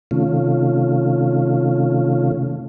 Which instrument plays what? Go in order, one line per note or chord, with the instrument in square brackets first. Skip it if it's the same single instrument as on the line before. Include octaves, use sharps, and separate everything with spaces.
[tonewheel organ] C3 D#3 A3 C#4 F4